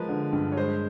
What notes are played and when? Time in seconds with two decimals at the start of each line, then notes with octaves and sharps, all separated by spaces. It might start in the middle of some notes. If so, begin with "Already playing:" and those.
Already playing: F3 G#3 A#4 B4
0.09 D3
0.33 G2
0.52 C#5
0.57 G#3 C5